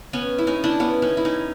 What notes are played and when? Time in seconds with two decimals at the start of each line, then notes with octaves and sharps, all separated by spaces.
0.13 B3 C#4
0.39 E4
0.47 C#4 D#4
0.64 D4 E4
0.80 B3 C#4
1.02 C#4 D#4
1.17 E4
1.25 C#4 D#4